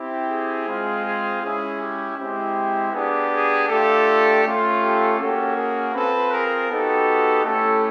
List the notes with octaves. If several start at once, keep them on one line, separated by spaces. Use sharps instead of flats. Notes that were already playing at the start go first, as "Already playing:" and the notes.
Already playing: C4 E4 G4
G#4
G#3 C4 F4
G#4
G#3 C#4 E4 G#4
G4
G#3 C4 E4 G4
B3 D4 G4 G#4
G#4
A3 D4 F4 G4 A4
A3 C#4 F4
G4 A4
A#3 C#4 F#4 G4 A4
G#4 A#4
C4 F4 A4 B4
G#4 A#4
B3 D#4 F#4 G4 A4
A3 C#4 E4 G4 A4